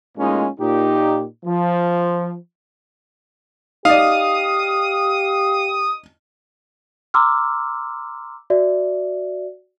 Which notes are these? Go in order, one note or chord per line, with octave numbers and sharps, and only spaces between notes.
A2 G#3 A#3 C#4 D#4 F4
A#2 D#4 G4
F3
D#4 G4 D5 F5 D#6
A#5 C6 D6 E6 F6
F#4 D5 E5